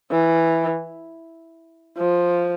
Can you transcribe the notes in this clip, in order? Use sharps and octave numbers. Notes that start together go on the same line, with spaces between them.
E3
F3